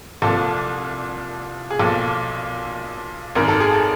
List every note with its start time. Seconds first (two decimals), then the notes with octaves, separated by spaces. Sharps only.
0.22 C2 A#2 F3 A4
1.71 G#4
1.79 B1 A#2 F3 A4
3.35 G#1 F#2 D#3 A#4
3.48 A4
3.60 G#4
3.72 A4